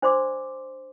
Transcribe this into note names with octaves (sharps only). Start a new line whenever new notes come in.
D4 C5 D5 C6 D6